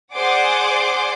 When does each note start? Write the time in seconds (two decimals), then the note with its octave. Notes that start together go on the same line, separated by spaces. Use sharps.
0.14 G#4 C5 D5 F#5 C6 D6